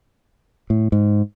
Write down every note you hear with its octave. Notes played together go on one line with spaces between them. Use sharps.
A2
G#2